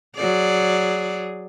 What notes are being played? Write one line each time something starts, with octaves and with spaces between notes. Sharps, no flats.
F#3 G#4 D5